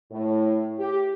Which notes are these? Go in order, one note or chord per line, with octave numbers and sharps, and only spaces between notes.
A2
G4